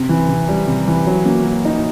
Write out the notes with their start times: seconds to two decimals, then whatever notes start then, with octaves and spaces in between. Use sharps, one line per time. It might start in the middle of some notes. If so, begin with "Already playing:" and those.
Already playing: C3 C4
0.09 E3
0.29 C3
0.49 G3
0.67 C3
0.87 E3
1.07 F#3
1.26 A#3
1.45 F#3
1.65 D#4